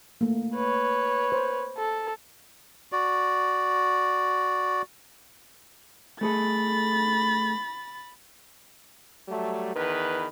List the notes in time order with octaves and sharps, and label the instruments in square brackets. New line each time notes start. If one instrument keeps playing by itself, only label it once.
[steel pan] A3 A#3
[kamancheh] B4 C#5
[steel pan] C5
[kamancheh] A4
[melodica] F#4 D5
[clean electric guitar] A3 G#4 A4 [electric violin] B5 A6
[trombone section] F#3 G3 A3
E2 D#3 B4